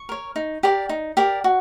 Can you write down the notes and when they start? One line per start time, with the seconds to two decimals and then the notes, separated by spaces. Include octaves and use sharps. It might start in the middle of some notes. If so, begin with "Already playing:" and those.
Already playing: C#6
0.09 A#4 C#5
0.36 D#4
0.63 G4 A#4 D5
0.89 D#4
1.17 G4 A#4 D5
1.44 F#4